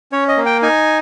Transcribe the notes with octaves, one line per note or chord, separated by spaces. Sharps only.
C#4 C#5
D#5
A#3
G5
D#4 G#5